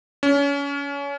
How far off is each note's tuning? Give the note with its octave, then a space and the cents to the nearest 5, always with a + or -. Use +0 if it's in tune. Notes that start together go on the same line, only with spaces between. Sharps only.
C#4 +30